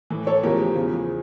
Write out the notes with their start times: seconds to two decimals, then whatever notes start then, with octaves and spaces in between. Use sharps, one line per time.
0.10 A2 E3
0.27 A4 C#5
0.43 E2 C#3 F3 G4 A#4
0.75 E2 C#3 F3